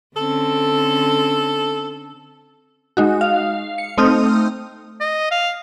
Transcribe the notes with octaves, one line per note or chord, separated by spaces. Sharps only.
D3 C4 C#4 A4
G#3 D#4 F#4
F5
C#7
A3 C4 D#4 D#6 F6 G6
D#5
F5